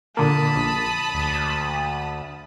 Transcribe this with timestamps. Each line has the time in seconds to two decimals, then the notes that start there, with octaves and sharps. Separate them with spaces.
0.17 A#2 D3 A#3 A5 B5 D#6
0.56 A#1
1.14 D2